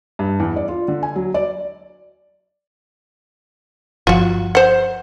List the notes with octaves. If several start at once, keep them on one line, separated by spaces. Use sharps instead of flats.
G2
E2
D5
F4
D3
G#5
F#3
D5
G1 F3 F4 F#4
C5 F#5